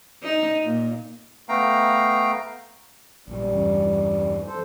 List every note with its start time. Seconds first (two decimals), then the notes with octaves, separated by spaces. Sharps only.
0.23 D#4
0.64 A#2
1.49 A3 B3 F5 G5 A#5
3.27 A#1 G#2 G3
3.52 E2 G2 C#3
4.46 F2 A4 C5